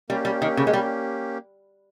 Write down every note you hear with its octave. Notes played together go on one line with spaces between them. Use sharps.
G3 A#3 C#4 G4
G3
D#3
C#3
G#3
G3